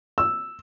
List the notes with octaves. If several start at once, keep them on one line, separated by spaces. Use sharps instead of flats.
E6